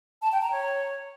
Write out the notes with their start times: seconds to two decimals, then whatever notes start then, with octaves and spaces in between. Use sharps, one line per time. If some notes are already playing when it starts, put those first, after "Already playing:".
0.22 A5
0.31 G5
0.41 A#5
0.51 C#5